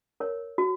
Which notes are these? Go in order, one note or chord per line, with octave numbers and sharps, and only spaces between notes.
A#4 C#5
F#4